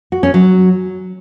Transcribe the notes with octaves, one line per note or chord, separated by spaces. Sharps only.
F#4
C#4
F#3